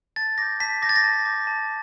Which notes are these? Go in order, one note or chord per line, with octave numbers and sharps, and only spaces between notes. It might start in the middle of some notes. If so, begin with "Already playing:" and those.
A5 A6
D6 G6 A#6
A5 B6
D6 G6 A6 A#6
A#6
A5
D6 G6
A5